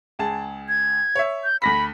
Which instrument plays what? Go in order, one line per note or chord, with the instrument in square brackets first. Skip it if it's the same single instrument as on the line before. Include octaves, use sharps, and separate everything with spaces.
[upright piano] C#2 G#4 A5
[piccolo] G#6
[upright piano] C#5 E5
[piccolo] G6
[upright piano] D2 A#6 B6 [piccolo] B5